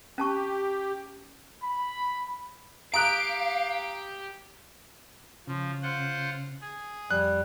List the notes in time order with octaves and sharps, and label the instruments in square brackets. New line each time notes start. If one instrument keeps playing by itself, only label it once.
[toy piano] C#4 A5 C#6 [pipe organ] G4
[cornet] B5
[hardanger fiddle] G4 [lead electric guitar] F5 [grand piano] A#5 D#6 F#6 [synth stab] D7
[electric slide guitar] C#3 [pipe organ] F3
[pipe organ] F4 C5 F#5
G#4
[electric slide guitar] F2 [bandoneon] G3 [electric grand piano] F#6